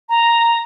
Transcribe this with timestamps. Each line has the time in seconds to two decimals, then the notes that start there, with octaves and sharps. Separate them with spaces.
0.09 A#5